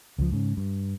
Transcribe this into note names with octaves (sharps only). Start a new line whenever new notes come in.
C#2 F3
G#2 C#3
G2